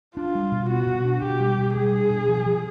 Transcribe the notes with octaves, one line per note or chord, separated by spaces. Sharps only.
D4 F4
G3
B2
B3 F#4
B2
D4
B2 G4
G3
B2
G3 G#4
D4
B2
F3
F3